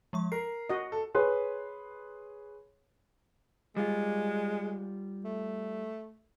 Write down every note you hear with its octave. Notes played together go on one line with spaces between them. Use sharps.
F3 G#3 C#6
A#4 C7
F#4 D#5
A4
G#4 B4 C#5 C6
G3 G#3 F4
A3